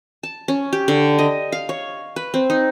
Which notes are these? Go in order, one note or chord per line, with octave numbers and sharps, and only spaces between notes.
A5
C#4
G4
D3
D#5
F5
C#5
B4
C4
D#4